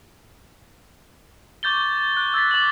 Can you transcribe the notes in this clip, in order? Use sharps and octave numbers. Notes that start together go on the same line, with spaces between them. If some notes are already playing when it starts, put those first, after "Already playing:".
C#6 D6 G6 A6 G7
F#6
E6 G#6 A6 B6
D6 F#7